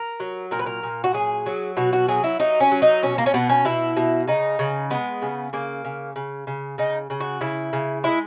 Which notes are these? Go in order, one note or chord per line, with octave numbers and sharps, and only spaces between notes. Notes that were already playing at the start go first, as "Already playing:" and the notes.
Already playing: A#4
F#3
A#2 A#4
B4
A#4
A#2
F#4
F#3 G#4
F#3
B2 F#4
F#4
F#3 G#4
E4
F#3 D#4
C#4
F#3
D#4
B2 C#4
A#3
C#4
B2 B3
C#4
B2 E4
B2
C#3 D#4
C#3
G#3 B3
C#3
C#3 A#3
C#3
C#3
C#3
C#3 D#4
C#3
F#4
C#3 E4
C#3
G#3 E4